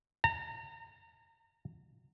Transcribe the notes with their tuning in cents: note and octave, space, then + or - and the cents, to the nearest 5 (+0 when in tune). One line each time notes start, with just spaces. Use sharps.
A#5 -35